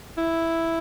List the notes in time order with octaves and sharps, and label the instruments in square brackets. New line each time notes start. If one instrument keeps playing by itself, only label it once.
[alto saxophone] E4